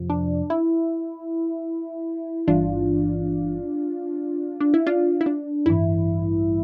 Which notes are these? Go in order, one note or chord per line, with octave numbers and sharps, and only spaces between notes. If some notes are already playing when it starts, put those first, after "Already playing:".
Already playing: F2 C3 F3
D4
E4
G1 G2 E3 D4 F4
D4
E4
D4 F4
E4
D4
A1 G2 E3 E4